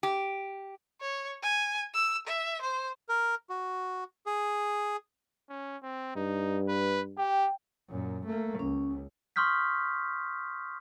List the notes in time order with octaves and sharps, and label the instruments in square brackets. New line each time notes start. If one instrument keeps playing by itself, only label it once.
[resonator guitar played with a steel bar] G4
[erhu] C#5
G#5
E6
E5
C5
[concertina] A#4
F#4
G#4
[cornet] C#4
C4
[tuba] G2 [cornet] D#4
[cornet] B4
[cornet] G4 [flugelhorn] G5
[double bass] F#2 A#2
A3 A#3
[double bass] C#2 [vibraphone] C#4
[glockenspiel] C6 C#6 D#6 F6 G6 B6